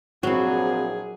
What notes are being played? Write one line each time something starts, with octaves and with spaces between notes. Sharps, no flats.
A#1 F#3 C4 E4 F#4 G#4